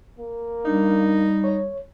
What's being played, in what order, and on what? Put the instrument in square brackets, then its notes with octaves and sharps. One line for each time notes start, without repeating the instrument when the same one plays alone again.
[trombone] A#3
[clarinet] G3 [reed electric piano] D4 [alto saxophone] D#4
[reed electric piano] C#5